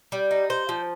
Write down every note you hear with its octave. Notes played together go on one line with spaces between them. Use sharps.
G3
D#4
C5
F3